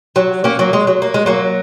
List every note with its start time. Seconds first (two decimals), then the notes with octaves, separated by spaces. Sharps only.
0.16 F#3
0.44 A#3 C#4
0.59 F#3 A#3
0.73 G#3
0.87 F#3
1.02 A#3
1.14 G#3
1.26 F#3 A#3